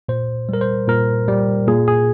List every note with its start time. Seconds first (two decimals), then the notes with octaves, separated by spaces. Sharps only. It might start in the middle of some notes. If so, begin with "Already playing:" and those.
0.09 A#2 C5
0.49 G3 A#4
0.61 C5
0.88 A#2 A#4
1.28 G3
1.67 A#2 G#4
1.88 G#4